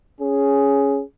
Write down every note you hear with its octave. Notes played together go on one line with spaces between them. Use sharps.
C#4 G#4